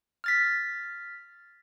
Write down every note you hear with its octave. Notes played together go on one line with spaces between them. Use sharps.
F6 A6 B6